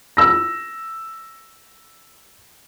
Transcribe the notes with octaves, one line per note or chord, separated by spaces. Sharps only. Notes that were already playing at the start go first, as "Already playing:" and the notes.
E6 A#6